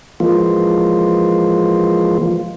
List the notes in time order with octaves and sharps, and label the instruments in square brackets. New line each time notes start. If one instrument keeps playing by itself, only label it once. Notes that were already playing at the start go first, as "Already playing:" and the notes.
[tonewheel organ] E3 F3 G#3 A#3 F4